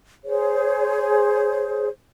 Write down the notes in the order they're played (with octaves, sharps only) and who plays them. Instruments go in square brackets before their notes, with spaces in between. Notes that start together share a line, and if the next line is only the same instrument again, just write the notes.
[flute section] G#4 C5 C#5